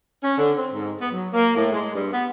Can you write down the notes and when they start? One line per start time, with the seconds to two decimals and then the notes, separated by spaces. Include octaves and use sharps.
0.22 C#4
0.37 D3
0.57 C4
0.73 G#2
1.00 B3
1.12 F#3
1.32 A#3
1.55 A2
1.71 G#3
1.93 G2
2.12 B3